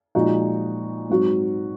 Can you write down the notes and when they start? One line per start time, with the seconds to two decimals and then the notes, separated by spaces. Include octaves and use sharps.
0.15 A#2 F3 G#3 D#4 F#4
1.09 G#2 F#3 C4 F#4